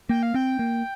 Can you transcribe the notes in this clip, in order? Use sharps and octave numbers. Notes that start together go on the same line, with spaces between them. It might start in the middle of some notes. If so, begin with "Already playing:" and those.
A#3 G5
F5
C4 G5
A#3